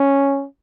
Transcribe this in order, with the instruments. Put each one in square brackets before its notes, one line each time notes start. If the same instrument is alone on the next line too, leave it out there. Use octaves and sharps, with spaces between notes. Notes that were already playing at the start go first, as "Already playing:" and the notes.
Already playing: [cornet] C#4